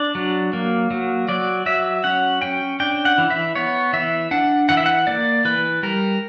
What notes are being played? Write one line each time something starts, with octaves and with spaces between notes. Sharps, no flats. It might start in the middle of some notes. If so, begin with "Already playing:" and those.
Already playing: D4 D5
F#3
A#3
F#3
F#3 D5
F#3 E5
C#4 F#5
C#4 G5
D4 G5
F#5
E3
E5
B3 C#5
E3 E5
D4 F#5
E3 F#5
E5
F#5
A#3 D5
E3 B4
G3 A#4